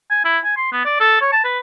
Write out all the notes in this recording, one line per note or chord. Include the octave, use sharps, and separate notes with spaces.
G#5
E4
G#5
C6
B3
D5
A4
C#5
A5
B4